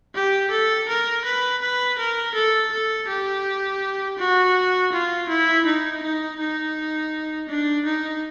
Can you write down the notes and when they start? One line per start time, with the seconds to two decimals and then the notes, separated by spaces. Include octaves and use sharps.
0.15 G4
0.51 A4
0.88 A#4
1.24 B4
1.61 B4
1.98 A#4
2.34 A4
2.72 A4
3.08 G4
4.18 F#4
4.92 F4
5.29 E4
5.66 D#4
6.02 D#4
6.39 D#4
7.49 D4
7.86 D#4